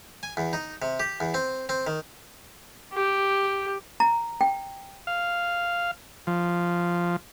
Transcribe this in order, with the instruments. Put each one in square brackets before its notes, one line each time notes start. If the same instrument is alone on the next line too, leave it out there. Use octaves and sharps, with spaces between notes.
[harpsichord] G#5
E2
D#4
C3
G4
E2
C4
C4
D#3
[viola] G4
[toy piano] A#5
G5
[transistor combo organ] F5
F3